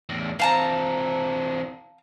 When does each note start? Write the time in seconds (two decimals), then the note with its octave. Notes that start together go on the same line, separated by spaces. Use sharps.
0.09 E2 A2
0.40 E3 C4 F5 A5 A#5